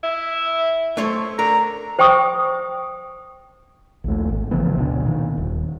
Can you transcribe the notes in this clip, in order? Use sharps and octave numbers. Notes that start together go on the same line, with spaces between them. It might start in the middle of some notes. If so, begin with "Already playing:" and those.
E4
A3 C5 C#5
D3 A#4 A#5
C5 G5 G#5 C#6 D#6
A#1 D#2 A3
G#1
C#3 E3 F3 B3
D2 B2 C4 D4
A#2 D#3
D#1